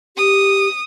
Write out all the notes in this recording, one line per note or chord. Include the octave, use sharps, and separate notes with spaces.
G4 D#6